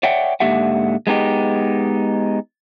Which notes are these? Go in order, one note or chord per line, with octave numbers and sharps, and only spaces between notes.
C#5 D5 E5 F#5 G5
G#2 D3 A#3 G4 E5 F#5
G#3 B3 D#4 G4